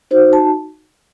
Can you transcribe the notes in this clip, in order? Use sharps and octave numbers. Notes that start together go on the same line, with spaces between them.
D#4 F#4 C5
A5